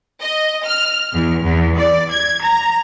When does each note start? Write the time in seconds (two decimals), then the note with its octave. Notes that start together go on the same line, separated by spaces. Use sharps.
0.21 D#5
0.64 F6
1.13 E2
1.43 E2
1.78 D5
2.10 G#6
2.43 A#5